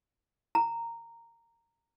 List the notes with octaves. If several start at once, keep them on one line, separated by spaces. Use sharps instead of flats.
A#5